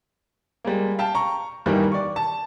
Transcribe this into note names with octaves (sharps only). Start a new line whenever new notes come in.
G3 G#3 A#3
F5 G5 A5
A#5 C#6
G2 D#3 E3 G3 A#3
D5 C#6
A5